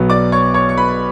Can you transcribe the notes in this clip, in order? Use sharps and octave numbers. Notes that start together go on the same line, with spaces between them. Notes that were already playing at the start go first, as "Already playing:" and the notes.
Already playing: B1 B2 F#3 B3
D5 D6
C#5 C#6
C#5 C#6
C#6
B4 B5